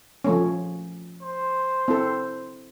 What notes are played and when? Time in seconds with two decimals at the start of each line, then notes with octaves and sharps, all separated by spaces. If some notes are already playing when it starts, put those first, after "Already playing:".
0.24 F3 A3 C#4
1.23 C5
1.88 C4 E4 A4